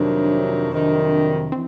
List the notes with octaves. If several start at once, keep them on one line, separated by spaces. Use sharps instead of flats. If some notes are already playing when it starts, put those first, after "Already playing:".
Already playing: F2 C3 D#3 F#3 D4
F2 C3 D#3 F#3
E3 C4